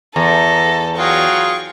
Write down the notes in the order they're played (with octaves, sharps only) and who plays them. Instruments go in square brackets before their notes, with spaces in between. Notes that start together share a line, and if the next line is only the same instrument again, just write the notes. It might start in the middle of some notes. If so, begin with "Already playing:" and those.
[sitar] E2 [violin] A4 [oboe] A#5
[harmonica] F#3 F4 [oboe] G#4 [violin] G5 C#6